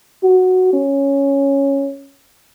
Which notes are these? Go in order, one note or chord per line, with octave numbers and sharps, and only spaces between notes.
F#4
C#4